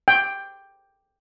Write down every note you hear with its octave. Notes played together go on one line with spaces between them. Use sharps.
G5